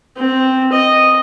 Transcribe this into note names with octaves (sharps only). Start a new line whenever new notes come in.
C4
D#5